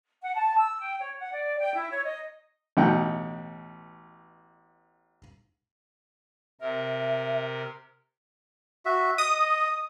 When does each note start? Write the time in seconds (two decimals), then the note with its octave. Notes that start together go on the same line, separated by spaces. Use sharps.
0.22 F#5
0.35 A5
0.57 E6
0.80 G5
1.00 C#5
1.19 F#5
1.32 D5
1.59 G5
1.74 E4
1.90 C#5
2.04 D#5
2.77 A1 B2 D#4 F#5 G5
6.61 C3 A#4 E5
8.86 F#4 E5
9.18 D#5 D#6